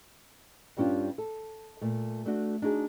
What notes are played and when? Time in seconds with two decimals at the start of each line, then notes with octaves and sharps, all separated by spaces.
0.77 G2 G3 C#4 D4 F4
1.18 A4
1.81 A#2 A3
2.26 A3 D4 F#4
2.62 D4 D#4 F#4 G#4